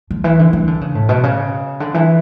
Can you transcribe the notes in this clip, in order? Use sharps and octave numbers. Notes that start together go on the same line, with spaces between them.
D3
E3
D3
E3
D3
C#3
A2
B2
C#3
D3
E3